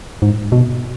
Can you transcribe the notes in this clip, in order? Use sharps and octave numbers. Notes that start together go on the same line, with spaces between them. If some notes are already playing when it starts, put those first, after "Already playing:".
G#2
B2